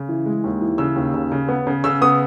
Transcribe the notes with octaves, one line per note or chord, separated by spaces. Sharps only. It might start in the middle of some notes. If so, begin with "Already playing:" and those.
Already playing: C#3
E3
G#3
D#2
E3
C#3 E6
D#2
C#3
C#3
B3
C#3
C#3 E6
B3 D#6